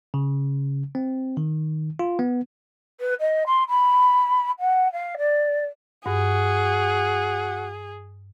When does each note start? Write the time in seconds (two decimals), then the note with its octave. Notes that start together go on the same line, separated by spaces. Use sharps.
0.14 C#3
0.95 C4
1.37 D#3
1.99 F4
2.19 B3
3.00 B4
3.20 D#5
3.46 C6
3.68 B5
4.59 F#5
4.92 F5
5.18 D5
6.06 G2 F#4 G#4